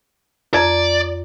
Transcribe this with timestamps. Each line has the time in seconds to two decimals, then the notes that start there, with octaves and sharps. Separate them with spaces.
0.54 F2 D5 A#5